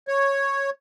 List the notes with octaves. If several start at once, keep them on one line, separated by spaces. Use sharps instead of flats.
C#5